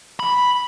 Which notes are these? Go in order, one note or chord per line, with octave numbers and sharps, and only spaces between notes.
B5